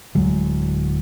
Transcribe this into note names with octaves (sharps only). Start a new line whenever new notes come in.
D1 F#3 G#3